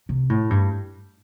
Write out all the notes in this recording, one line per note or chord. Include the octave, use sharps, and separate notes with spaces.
C3
A2
G2